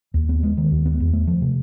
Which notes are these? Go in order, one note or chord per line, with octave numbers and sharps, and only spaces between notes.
D#2
B3
G#3
D#3
D#2
B3
E2
A3
F3
C3